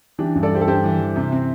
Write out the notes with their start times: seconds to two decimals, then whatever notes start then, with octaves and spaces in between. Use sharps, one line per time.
0.18 E3 D4 G4
0.35 G2
0.43 A4 D5
0.52 G2 G4 C5
0.61 A4
0.67 G2 G4 C5
0.84 E3
1.00 E3
1.16 C3
1.32 C4